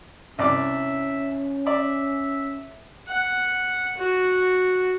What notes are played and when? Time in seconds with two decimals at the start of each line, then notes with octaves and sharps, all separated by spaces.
0.39 C2 C#4 D5 E5 D6
1.67 D5 E5
3.08 F#5
3.97 F#4